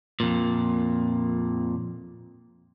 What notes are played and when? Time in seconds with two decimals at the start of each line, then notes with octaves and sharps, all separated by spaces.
0.20 F2 A#2